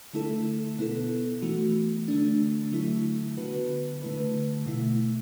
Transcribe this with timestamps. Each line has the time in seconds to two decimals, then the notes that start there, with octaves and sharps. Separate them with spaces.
0.13 D3 A3 E4 A4
0.78 B2 B3 E4 A4
1.42 E3 A3 F#4
2.08 D3 A3 D4
2.72 D3 F#3 A3 E4
3.37 D3 B3 F#4 B4
4.02 D3 A3 E4 B4
4.66 B2 A3 E4